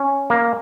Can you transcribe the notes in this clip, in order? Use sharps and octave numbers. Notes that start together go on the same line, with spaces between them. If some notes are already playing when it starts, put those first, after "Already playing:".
Already playing: C#4
A#3